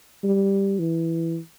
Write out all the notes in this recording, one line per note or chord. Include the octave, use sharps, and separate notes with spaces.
G3
E3